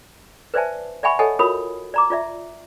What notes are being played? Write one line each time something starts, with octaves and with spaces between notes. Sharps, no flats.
B4 C5 D5 E5 G#5 A5
D5 E5 F#5 G#5 B5 C#6
A4 C#5 D#5 F#5 G#5 A5
F4 F#4 A#4 C#5 B5 D#6
D5 A#5 D6
F4 D5 E5